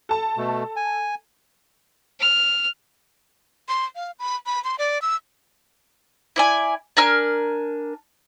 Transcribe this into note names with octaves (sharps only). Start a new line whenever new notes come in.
A4 A5
B2 A3
G#5
F6
C6
F5
B5
B5
C6
D5
E6
E4 D5 G#5
D4 A#4 G#5 F6